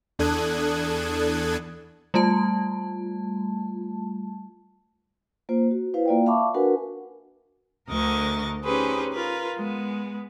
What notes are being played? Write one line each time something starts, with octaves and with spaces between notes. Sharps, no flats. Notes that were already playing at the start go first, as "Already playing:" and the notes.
E2 D4 A4 D#6 F#6 G#6
G3 A3 F4 A5
A#3 F4 C5
F#4
E4 B4 C5 F5
A#3 F4 D5 F5 G5
E5 F5 A5 B5 C#6 D6
D4 F#4 A#4 B4 F#5 G#5
D2 D3 A#4 D#5 C#6 A6
C#4 D#4 G4 G#4 B4 C5
F4 A#4 B4
G#3 B3